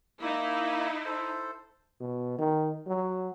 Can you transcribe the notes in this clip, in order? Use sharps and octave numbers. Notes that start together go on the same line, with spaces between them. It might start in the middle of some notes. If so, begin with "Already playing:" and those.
A#3 D#4 E4
A4 C5
B2
D#3
F#3